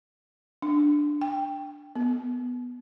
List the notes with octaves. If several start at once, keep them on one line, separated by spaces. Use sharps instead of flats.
D4
G5
B3